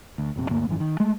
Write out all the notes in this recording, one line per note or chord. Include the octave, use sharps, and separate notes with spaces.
D2
F1 A#1 C3
D2 G2 A#3
G#1 F#2 E3
D#3
G#3 A3